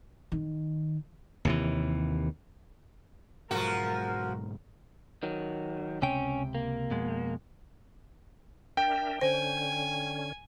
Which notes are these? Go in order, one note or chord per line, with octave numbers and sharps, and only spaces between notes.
D#3
D#2 C3 E3
B1 G#2 F3 F#4 A#4
D#3 F#3
C#2 C3 C#4 G5
A#3
F2 B2 G#3
D4 A#4 E5 G5
D3 C#4 C5 G#5